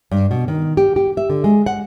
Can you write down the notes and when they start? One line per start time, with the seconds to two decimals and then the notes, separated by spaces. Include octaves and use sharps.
0.11 G2
0.31 B2
0.48 D#3
0.77 G4
0.96 G4
1.17 E5
1.30 D3
1.44 G#3
1.66 F#5